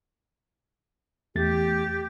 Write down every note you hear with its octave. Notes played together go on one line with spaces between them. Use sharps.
E2 A3 G4 A6